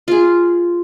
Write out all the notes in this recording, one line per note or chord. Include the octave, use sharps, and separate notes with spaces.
F4 G#4